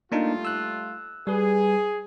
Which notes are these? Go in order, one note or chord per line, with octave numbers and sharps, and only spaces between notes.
G3 A3 A#3 D4 D#4 F4
E6 F#6
G3 G#4 B4